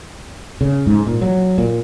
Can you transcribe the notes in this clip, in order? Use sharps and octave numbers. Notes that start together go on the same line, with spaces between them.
C#3
G#2
A#2
F#3
A#2